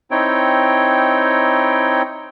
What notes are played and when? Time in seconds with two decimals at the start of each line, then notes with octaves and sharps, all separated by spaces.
0.11 C4 D#4 E4 C#5 G5